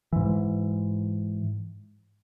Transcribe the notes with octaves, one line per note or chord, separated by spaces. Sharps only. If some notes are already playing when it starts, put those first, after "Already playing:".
G#2 E3